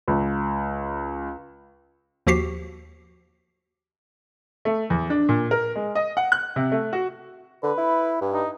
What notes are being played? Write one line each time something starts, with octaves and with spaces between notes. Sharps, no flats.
C#2
D#2 F3 F#4 G4 B6 C7
A3
E2
D4
A#2
A#4
G#3
D#5
F#5
F#6
C3
A3
F#4
D3 B4
E4
G2
D#4